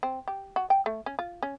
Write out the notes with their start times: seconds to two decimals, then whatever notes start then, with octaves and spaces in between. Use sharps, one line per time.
0.03 C4
0.28 G4
0.56 F#4
0.70 G5
0.86 A3
1.06 C#4
1.19 F4
1.43 C#4